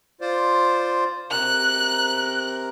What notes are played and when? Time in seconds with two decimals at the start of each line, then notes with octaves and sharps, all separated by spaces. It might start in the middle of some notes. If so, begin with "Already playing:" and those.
0.21 F4 C5 D5
1.31 C3 A#4 F#6